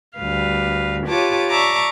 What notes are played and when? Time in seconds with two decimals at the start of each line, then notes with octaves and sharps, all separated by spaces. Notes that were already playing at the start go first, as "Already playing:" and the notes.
0.16 D2 G3 B4 F5
1.07 F4 G4 B4 C#5 A5 D6
1.49 D5 E5 A5 A#5 C#6 D6